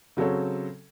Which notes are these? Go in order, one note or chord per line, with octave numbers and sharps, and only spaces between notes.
C#3 F#3 C4 A4 C#5